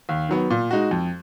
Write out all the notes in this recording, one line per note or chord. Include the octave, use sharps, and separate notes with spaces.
D#2
D#3 F#3 B3
A#2
G#3 D#4 F#4
F2